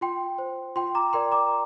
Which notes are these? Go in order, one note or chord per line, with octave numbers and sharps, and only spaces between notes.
F4 G5 C6
C5
F4 G5 C6
A#5 D6
A#4 D5 G5 C6
A#5 D6